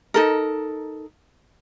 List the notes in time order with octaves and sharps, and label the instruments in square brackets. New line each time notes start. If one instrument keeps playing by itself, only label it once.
[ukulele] D#4 A4 A#4